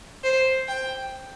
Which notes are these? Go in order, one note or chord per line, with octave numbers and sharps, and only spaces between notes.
C5
G5